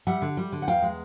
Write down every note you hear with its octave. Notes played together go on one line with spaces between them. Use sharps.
G3 E5 F#5
D3
G3
D3
F#5
E2 F5 G5
G#3